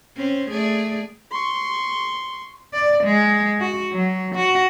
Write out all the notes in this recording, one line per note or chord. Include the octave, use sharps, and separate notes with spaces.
C4 C#4 C5
A3 G#4 D5
C6 C#6
D5
G#3
F#4
F#3
F#4